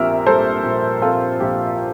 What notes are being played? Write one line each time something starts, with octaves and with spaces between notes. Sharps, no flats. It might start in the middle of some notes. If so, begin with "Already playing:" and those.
Already playing: A#1 A#2 G3 C4 A#4 E5
G3 A4 C5
A#2
C4 F4 A4
A#1 G4